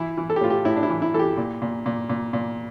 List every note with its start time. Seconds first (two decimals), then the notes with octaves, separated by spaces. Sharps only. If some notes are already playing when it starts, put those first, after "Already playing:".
Already playing: E3 E4
0.17 E3
0.30 A4
0.36 G4
0.41 A2 F4
0.50 G4
0.65 A2 E4
0.76 D4
0.83 E4
0.90 E3
1.02 E4
1.14 E3 A4
1.19 G4
1.37 A#2
1.62 A#2
1.86 A#2
2.10 A#2
2.33 A#2